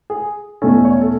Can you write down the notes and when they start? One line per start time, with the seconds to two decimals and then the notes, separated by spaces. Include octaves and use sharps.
0.10 G#4
0.62 E2 B2 A3 C#4 A4
0.85 C#5
1.01 A4